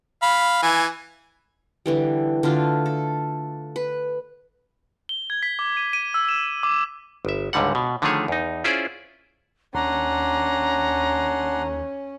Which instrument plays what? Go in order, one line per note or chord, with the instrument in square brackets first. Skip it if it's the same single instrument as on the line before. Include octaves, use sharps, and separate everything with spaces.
[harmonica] F5 B5
E3 G#5
[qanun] D3 E3 G3
D3 A3 F4
A4
B4
[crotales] G7
G#6
B6
D6
D#7
D#7
E6
E7
D6
[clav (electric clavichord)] G1 E5
C#2 G#2 D3 G3 F#5
B2
D3 D#3 F3 A3 G#4 C#5
E2 D#4
C#4 E4 F4 G#4 C5 D5
[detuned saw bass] D#2 [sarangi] C#4 [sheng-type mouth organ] D4 F#5 C6 [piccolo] A#5